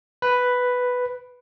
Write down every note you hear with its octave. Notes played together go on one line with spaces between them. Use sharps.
B4